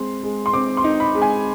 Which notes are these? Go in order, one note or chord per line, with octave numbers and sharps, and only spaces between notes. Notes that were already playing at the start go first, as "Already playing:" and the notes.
Already playing: G#3 C4 C6
G#3
C6
C4 D6
C6
D#4
B5
G#3
G#5